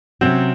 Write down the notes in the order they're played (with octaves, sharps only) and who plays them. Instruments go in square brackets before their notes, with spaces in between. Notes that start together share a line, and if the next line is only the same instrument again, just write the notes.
[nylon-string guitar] C3 F#3 C#4 F#4 [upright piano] C4